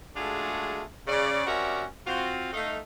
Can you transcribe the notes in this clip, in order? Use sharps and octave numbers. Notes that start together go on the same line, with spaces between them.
G#3 A3 D4 F4 F#4 G#4
C#3 D5
C3 C#4 F#4 A#4 D5 E5
C4 F4 F#4
A3 D#4 F5